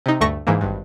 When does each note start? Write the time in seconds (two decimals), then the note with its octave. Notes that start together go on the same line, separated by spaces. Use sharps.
0.06 C3 D#4
0.21 D2 G2 A3 C#6 A#6
0.47 G#2 E3 A#3
0.61 G#1 G2